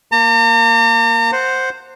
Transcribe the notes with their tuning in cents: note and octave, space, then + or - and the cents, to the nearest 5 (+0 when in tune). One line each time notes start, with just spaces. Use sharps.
A#3 +0 A#5 -45
C5 +0 F#5 +0